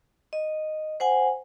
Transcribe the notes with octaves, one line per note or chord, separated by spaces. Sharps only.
D#5
C5 F#5 G#5